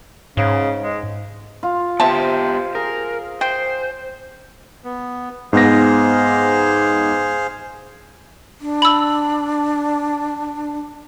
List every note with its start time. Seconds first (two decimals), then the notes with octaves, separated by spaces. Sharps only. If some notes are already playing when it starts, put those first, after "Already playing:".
0.37 G#2 C#3
0.83 G#3
1.63 F4
2.00 B3 C4 G4 C5 E5 A5
2.75 G#4 A#4
3.41 C5 G5
4.84 B3
5.53 G#2 B3 G#4 C5 F5 A#6
8.61 D4
8.82 B5 E6